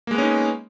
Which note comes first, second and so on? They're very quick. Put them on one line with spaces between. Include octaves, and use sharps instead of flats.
A#3 G#3 B3 C#4 D#4